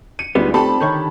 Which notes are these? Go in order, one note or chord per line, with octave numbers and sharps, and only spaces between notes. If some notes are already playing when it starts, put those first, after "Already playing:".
C#7 D#7
D2 G3 G#3 B3 D#4 F4 D5
A3 C4 G4 A4 A5 B5
D3 D#3 C#5 C#6 G6